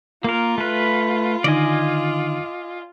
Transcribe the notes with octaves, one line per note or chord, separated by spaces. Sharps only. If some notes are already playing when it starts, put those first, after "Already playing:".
A#3 F4 A#4
A3 B4
D3 D#3 D#4 D5 D#5 G#5